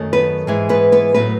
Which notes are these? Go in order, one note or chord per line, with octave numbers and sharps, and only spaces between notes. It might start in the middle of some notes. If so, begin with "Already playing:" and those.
Already playing: F#2 D#3 F#3 A3
B3 B4
G#2 E3 G#3
B3 B4
B3 B4
A2 F#3 A3 B3 B4